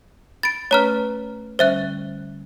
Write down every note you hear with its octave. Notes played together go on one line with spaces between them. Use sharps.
B5 A6 D7
A3 C#4 B4 C#5 A#5 F6
D3 G3 C#4 C5 E5 F#6